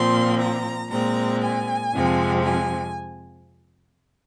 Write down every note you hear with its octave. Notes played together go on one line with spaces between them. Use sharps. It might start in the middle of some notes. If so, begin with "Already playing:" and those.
Already playing: A#2 F3 C4 C6
A#5
A#2 G#3 C4 A#5
G#5
F2 C3 F3 G#3 C4
G#5